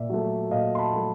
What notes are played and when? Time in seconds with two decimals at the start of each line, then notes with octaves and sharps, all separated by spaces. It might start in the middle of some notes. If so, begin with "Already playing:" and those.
Already playing: A#2 D5 E5
0.10 F#3 A3
0.51 A#2 D#5 F5
0.75 C6
0.79 A5 B5
0.94 F#3 A3